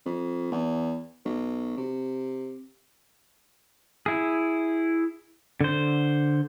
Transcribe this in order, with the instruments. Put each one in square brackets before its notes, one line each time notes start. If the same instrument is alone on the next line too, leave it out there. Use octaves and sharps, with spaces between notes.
[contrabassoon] F2
E2
B1
C3
[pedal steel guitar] E4 G#4
D3 C5